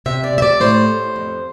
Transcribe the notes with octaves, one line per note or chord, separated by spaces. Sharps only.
C3 E5
D5
C3
E5
D5
A2 C5
A2
F2